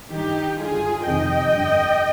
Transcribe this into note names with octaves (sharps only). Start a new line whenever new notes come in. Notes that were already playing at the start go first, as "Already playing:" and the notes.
G2 D#3 D#4 G4
G2 D3 F4 G#4
F2 C3 D#3 D#5 G5
G2 D3